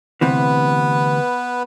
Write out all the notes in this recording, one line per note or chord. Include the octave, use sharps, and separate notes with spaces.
D2 C3 E3 B3 B4